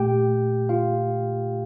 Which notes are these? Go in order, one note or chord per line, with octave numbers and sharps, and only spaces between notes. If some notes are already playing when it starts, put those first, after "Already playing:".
Already playing: A#2 A3 G4 G5
F4 F5